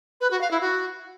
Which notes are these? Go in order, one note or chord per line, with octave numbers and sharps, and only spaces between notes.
B4
F#4
F5
E4
F#4